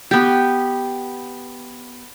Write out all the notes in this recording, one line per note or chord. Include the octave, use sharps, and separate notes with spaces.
B3 G4